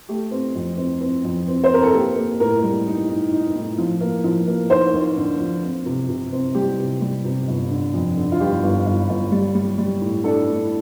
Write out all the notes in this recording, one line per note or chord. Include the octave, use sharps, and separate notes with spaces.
A3 G4
C4
F2
C4
C4
F2
C4
C5
C4 A#4
A4
A#3 G4
A#3
A2 A#4
G3
D#4
D#4
D#4
A2
F3
A#3
F3
A#3
D#2 C5
D#2
D3
F3
C4
C3
C3
C4
G3 G4
C3
G3
C3
G1
D3
F2
D3
F4
G1 G4
G1
G1
G1
G3
G3
G3
A2
D4 A4
A2